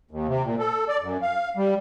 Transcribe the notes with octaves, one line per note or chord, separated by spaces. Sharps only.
D#2
C3
A#2
A4
D5
F#2
F5
G3